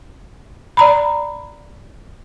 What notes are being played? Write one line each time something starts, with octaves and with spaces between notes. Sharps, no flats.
D5 A#5 B5